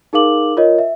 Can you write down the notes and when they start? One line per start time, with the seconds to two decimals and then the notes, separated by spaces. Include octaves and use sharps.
0.13 D#4 G#4 A#4 F5 D6 F#7
0.57 F4 A#4 C#5 D#5
0.78 E5